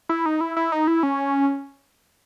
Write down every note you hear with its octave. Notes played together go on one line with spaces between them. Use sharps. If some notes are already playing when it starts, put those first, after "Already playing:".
E4
D#4
E4
E4
D#4
E4
C#4